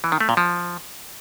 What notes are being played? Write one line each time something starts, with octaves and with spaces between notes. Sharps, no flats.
E3
D#3
A3
A#2
F3